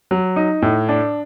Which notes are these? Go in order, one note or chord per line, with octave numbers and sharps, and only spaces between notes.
F#3
D#4
A2
D4